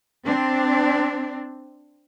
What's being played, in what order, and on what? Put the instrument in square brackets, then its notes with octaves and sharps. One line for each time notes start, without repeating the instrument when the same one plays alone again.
[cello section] C4 D4